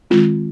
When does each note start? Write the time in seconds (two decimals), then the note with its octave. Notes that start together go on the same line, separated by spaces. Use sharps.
0.10 D#3 G#3 C4 F4